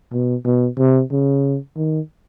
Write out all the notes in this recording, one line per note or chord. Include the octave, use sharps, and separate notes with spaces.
B2
B2
C3
C#3
D#3